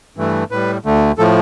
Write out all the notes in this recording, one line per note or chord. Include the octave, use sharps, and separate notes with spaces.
G2 E3 A3
A2 G3 B4
D2 D3 A3
A2 F3 A3 A4